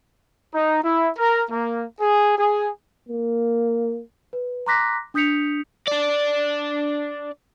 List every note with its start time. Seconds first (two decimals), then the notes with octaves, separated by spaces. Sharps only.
0.53 D#4
0.83 E4
1.18 A#4
1.50 A#3
2.00 G#4
2.37 G#4
3.09 A#3
4.33 B4
4.66 A#5 C6 D6 F#6 A#6 B6
5.14 D4 D#6 G6 B6 C#7 F7
5.88 D4 D5